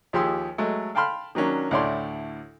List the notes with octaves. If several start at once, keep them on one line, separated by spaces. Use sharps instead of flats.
D#2 F3 G4 G#4 C6 E6
F#3 G#3 A3
F5 G5 A5 B5 C6 F6
D#3 F#3 A#3 C#4 D4
D2 A2 E4 C#5 D5 C6